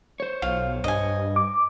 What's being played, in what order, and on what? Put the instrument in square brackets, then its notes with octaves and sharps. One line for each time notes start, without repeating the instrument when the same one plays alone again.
[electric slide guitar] C5 C#5
[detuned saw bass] B1 [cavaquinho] F4
[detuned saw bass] G2 [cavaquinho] D#5 G#5
[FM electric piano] D6